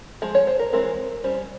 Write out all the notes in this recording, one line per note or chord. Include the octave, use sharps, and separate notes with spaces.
F3 G#3
C#5
C5
A#4
E3 G#3 C4 A#4
G3 C#4 C5